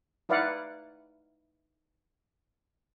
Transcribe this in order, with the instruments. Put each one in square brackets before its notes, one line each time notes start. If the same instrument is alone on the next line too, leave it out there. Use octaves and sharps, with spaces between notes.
[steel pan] D#4 E4 B4 D5 F5 F#5